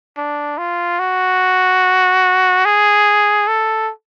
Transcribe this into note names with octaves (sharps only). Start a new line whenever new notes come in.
D4
F4
F#4
G#4
A4